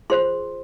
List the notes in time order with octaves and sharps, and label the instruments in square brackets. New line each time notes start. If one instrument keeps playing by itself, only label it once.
[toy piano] F4 G#4 C5 C6